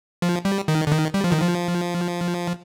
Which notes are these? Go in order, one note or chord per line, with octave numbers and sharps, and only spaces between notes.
F3
G3
D#3
D3
D#3
G3
F3
D#3
F3